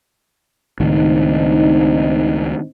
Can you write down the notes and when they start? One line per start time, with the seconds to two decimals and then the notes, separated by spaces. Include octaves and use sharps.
0.80 C#2 A2 D#3 C4 D4 D#4